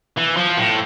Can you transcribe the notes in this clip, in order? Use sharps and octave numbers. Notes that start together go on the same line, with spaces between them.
E3
F3
A2